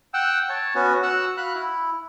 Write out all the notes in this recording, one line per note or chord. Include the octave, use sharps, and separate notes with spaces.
F#5 G5 E6
C#5 A5
B3 C#4 F#4
F#4 F#5 E6
F#4 F5 B5 F#6
E4